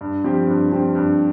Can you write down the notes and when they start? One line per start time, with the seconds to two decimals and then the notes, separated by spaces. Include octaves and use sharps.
0.01 G2
0.24 F3 C4 G4
0.48 G2
0.72 F3 C4 G4
0.95 G2